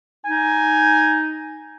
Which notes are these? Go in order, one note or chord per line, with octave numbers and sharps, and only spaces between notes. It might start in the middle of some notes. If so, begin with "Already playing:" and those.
D#4 G#5